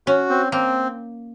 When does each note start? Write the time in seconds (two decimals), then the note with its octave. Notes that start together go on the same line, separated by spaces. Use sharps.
0.07 C#4 F#4
0.29 C4
0.52 A#3 C4